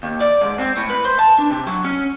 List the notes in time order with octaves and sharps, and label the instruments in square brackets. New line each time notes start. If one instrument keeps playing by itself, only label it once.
[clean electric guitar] D#2
D5
G#2
C4
A2
B4
C5
A5
D4
C3
F#3
C#4